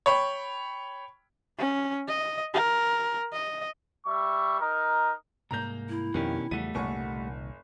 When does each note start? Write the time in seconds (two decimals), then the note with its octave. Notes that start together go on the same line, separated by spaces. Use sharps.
0.06 C#5 G5 B5
1.58 C#4
2.08 D#5
2.54 A#4
3.33 D#5
4.06 G3 E5 C#6
4.61 D#4 A#4
5.51 C2 G#2 A#3 A#5 G6
5.89 E4
6.14 F2 B2 D#3 G3 C#4 G4
6.51 E2 C#3 F3 G3 A3 F#5 D#7
6.75 F#1 C2 A#2 D#3 F#5 G#5 C#6